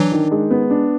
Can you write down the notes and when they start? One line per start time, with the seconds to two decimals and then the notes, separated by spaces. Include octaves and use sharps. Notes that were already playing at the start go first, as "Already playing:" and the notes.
Already playing: E3 F#3 D4
0.12 D#3
0.31 G#3
0.51 B3
0.70 D4